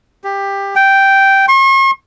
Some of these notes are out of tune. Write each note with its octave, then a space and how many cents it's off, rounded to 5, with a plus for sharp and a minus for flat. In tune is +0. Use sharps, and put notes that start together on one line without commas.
G4 +15
G5 -5
C#6 -45